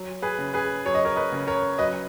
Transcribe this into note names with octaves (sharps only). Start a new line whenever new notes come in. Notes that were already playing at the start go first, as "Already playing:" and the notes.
Already playing: F#3
G#4 B4
C#3
G#4 B4
F#3 C#5
D#5
A#4 C#5
B4 D#5
C#3
A#4 C#5
F#3 B4 D#5